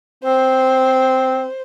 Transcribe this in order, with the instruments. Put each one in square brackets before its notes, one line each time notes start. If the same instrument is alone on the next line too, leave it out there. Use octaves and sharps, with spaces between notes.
[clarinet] C4 [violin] C5